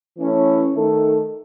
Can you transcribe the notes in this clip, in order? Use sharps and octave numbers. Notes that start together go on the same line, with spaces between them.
E3 A3 C#4 E4
D#3 A3 D#4 A4